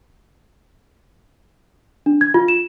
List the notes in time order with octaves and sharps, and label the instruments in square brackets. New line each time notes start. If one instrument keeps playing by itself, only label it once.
[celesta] D4
G#6
F4
E7